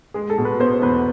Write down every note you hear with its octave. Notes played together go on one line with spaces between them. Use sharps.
G#3 G#4
A4
B2
B4
B3 C5
E2 B4